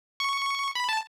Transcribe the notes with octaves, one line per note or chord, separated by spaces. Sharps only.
C#6
B5
A5